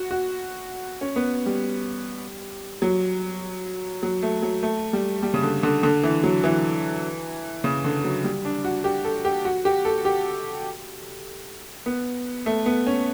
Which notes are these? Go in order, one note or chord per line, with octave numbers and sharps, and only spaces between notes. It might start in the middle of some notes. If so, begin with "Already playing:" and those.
Already playing: F#4
F#4
C#4
B3
G3
F#3
F#3
A3
F#3
A3
G3
G3
C#3
D3
D3
D3
E3
F#3
E3
C#3
D3
F#3
G3
D4
F#4
G4
A4
G4
F#4
G4
A4
G4
B3
A3
B3
C#4